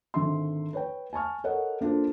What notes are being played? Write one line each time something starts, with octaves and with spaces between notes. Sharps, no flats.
G#1 D3 E5 C6
B4 C#5 G5
G#5 A5 C#6 F6
A4 A#4 C#5 D#5 F#5
A#3 D4 F4 A4 C5